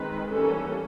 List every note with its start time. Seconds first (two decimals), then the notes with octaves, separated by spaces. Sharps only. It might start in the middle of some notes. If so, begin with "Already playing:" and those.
Already playing: D#3 G#3 C4 B4
0.31 E3 G3 A#3 C#4 A4